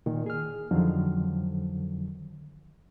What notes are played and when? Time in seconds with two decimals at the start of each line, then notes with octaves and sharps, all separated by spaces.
0.06 A#2 D#3
0.26 G#4 F6
0.71 F2 D3 D#3 F3 F#3